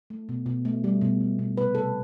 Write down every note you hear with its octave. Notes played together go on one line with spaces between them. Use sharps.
A3
B2
B2
A3
G3
B2
G3
B2
C3 B4
C3 A4